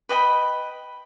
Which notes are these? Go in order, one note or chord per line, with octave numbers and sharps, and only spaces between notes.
B4 D#5 G5 B5